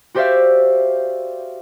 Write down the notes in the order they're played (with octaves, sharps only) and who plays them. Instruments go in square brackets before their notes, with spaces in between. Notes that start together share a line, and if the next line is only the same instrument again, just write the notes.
[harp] F#4 G4 C5 D5 E5 F5